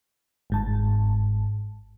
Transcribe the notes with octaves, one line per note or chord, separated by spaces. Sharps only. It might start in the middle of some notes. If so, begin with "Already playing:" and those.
G1 G#2 A5